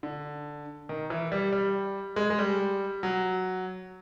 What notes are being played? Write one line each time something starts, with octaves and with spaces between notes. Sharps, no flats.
D3
D#3
E3
G3
G3
G#3
G#3
G3
F#3